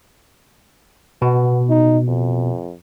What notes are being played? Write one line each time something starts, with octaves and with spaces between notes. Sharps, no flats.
B2 B3
D#4
F2